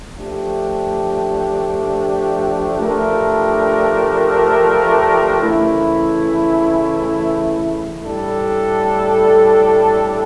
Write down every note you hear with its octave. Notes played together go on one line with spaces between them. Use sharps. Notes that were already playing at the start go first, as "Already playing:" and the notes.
F3 A3 D4 G4
F3 A3 D4 G4 A#4
C#3 E3 A3 E4
A2 G3 D4 A4